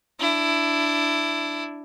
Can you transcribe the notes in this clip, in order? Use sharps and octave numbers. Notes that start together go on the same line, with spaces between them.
D4 E4